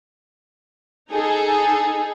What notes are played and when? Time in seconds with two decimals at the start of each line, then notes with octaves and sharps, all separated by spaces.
1.11 D#4 G#4 A4